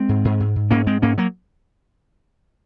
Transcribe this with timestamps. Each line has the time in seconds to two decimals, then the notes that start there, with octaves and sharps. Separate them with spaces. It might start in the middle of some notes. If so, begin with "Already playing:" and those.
Already playing: G#3 C4
0.09 G#2
0.25 G#2
0.40 G#2
0.56 G#2
0.71 G#2 A#3 C#4
0.87 G#2 G#3 C4
1.02 G#2 A#3 C#4
1.18 F#3 A#3